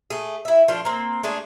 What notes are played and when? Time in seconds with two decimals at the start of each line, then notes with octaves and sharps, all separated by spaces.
0.10 A3 G#4
0.45 E4 E5
0.68 F3 A3 D4 F4
0.85 A#3 C4
1.23 G#3 A3 D4 G#4